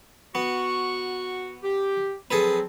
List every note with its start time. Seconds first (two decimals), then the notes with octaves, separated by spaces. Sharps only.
0.35 B3 F#4 C#6
1.63 G4
2.31 F3 F#3 C4 G#4 A4 B4